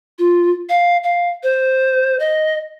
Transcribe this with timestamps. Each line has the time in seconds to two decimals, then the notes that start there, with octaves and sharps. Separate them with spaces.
0.19 F4
0.69 F5
1.04 F5
1.43 C5
2.20 D#5